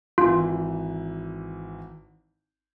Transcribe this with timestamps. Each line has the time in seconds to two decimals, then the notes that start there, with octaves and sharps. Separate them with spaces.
0.18 G#1 E3 F4